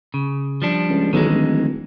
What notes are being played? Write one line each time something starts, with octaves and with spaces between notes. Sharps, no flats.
C#3
F3 G3 D4
C#2
B1 D#3 E3 G#3
D1